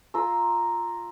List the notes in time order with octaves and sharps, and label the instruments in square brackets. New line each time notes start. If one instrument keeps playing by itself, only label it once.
[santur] F4 A#5 C6 E6